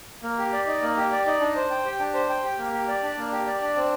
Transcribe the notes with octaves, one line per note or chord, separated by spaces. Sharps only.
A#3
G4
D5
D#4
A#3
G4
D5
D#4
D4
C5
G5
G4
D4
C5
G5
G4
A#3
G4
D5
D4
A#3
G4
D5
D4
C4